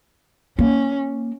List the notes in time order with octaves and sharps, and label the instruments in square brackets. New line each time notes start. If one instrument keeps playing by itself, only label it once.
[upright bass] A#3 [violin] C#4